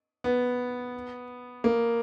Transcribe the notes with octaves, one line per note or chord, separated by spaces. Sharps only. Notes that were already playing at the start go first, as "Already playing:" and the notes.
B3
A#3